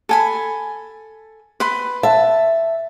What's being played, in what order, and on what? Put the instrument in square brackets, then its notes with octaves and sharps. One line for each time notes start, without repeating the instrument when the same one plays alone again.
[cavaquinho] A4 G#5 B5
B4 B5 C6
[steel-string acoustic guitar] E5 [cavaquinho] A5